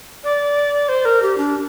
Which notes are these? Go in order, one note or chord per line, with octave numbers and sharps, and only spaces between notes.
D5
C5
A#4
G4
D4